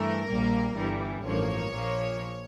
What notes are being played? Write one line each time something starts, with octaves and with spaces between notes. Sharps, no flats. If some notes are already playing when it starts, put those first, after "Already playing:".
Already playing: G2 E3 A3 A#4
A#1 A#2 G3 A#3
G1 G2 E3 G3
A1 G2 F3 A#3 C#5
A#1 A#2 F3 A#3